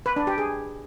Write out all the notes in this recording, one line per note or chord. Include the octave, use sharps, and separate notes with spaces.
B4
D4
G4
G#4